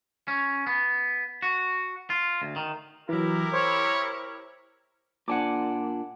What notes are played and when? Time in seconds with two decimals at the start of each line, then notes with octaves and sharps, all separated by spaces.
0.28 C#4
0.67 B3
1.42 F#4
2.10 F4
2.42 D2
2.56 D#3
3.09 E3 F#3 E4 G4 A#4
3.54 C5 C#5
5.28 A#2 D4 F#5 G#5 D6